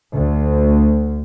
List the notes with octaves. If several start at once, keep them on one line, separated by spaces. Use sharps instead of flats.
D2